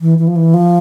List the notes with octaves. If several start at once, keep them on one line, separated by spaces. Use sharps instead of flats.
E3
E3
F3
E3
F3